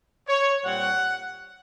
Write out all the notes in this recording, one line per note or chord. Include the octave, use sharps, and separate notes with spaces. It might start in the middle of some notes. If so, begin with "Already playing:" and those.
C#5
A#2 G3 C4 F#5